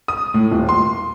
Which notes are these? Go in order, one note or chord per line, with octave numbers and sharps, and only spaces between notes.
D#6
A2
D#1
C6